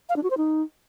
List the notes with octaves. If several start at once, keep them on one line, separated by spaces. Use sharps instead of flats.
F5
D4
F#4
C5
D#4